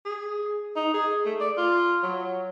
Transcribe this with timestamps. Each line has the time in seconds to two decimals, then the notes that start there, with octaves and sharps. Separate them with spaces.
0.05 G#4
0.76 D#4
0.94 G#4
1.26 A3
1.41 D5
1.57 F4
2.03 F#3